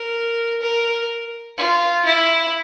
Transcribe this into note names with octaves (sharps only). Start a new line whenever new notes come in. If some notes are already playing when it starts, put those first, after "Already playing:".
Already playing: A#4
A#4
F4
E4